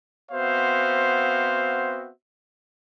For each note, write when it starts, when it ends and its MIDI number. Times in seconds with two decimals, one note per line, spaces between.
0.32 2.11 59
0.32 2.11 60
0.32 2.11 66
0.32 2.11 72
0.32 2.11 76
0.32 2.11 77